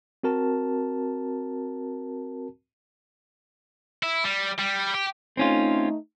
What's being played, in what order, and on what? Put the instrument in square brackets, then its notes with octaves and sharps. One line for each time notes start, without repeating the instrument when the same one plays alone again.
[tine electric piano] C4 F#4 A#4 A5
[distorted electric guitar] E4
G3
G3
G4
[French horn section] A3 D#4 [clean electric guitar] C4 C#4 F4